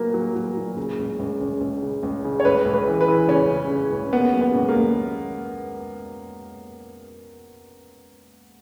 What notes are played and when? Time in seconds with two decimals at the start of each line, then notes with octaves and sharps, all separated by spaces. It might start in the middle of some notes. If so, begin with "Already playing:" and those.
Already playing: A#2 F#3 A#3 A#4 B4
0.14 F#3
0.36 F#3
0.57 A#2
0.77 C#3
0.98 C#2
1.19 C#2
1.41 C#2
1.60 C#2
1.83 C#3
2.03 C#2
2.24 C#3
2.40 C#5
2.45 C#2 B4
2.65 C#2
2.73 B4
2.87 E3
3.01 B4
3.08 E3
3.28 C#3 C#4
3.50 C#3
3.70 C#3
3.92 C#2
4.13 A#3 B3
4.33 F#3
4.41 B3
4.55 C#2
4.69 A#3
4.76 C#2